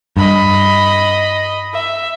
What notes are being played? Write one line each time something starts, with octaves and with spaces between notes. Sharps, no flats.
G2 D#5 B5
E5